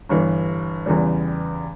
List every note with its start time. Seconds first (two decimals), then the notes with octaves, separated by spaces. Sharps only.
0.09 G1 G2 E3
0.86 E2 C#3 E3 G3